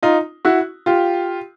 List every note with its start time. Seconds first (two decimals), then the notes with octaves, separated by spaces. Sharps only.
0.03 D#4 F4
0.45 E4 F#4
0.86 F4 G4